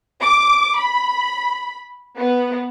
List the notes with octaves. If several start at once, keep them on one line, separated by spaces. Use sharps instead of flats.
D6
B5
B3